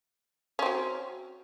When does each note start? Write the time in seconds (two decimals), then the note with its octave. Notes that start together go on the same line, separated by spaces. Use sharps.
0.59 C#4
0.62 C4
0.66 F#3